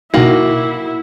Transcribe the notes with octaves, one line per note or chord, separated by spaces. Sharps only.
B2 A#3 D#4 E4 F#4